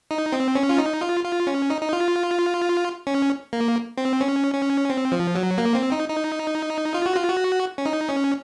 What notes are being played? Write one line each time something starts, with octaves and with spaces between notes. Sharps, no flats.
D#4
C4
C#4
F4
D#4
F4
F4
C#4
D#4
D#4
F4
C#4
A#3
C4
C#4
C#4
C4
F3
F#3
A#3
C4
D#4
D#4
F4
F#4
F4
F#4
C#4
D#4
C#4